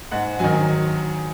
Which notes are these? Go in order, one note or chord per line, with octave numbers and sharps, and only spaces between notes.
G#2 F#5
D#3 F#3 G#5